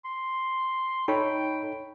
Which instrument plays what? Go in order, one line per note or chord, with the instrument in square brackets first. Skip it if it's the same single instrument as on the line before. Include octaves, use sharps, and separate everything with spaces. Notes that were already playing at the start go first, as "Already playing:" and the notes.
[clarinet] C6
[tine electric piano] D#4 [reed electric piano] A4 C#5 B5 [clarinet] G5